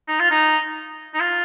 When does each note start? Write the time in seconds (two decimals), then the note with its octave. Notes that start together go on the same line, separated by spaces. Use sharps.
0.08 D#4
0.19 F4
0.31 D#4
1.14 D#4
1.20 F4